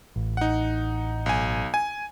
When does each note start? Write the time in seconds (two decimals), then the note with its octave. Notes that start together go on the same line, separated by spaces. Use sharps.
0.16 A1
0.37 D#4 F#5
1.26 B1 G#5
1.74 G#5